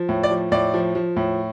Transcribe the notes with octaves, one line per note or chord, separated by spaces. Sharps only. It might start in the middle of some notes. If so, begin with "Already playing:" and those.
Already playing: F3
A2
D5
F3
A2 D5
F3
F3
A2